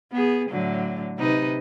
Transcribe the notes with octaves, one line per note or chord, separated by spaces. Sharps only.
B3 G#4
A2 D3 F#3
C3 D#4 B4